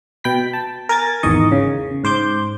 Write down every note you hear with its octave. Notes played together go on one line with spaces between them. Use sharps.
B2 G5 B5 B6
A5
A#4 G#5 G#6 A6
G#1 E2 D#3 D#5 C#6
C#3
G#2 C5 D6 G6